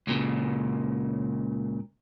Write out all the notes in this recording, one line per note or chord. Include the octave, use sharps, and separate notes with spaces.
C#2 A#2 C#3